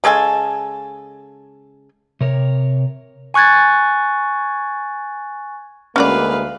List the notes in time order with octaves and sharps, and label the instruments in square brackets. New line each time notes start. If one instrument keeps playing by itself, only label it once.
[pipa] C#3 G#3 A4 G#5
[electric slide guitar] C3 A#4 C#5
[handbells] G#5 C#6 F#6 G#6 A6
[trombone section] D2 G#3 A#3 [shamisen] C#4 F#4 D5 [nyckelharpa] B4 F5